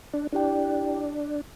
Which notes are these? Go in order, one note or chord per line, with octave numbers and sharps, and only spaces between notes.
D4
D4 E4 G4 D5 G5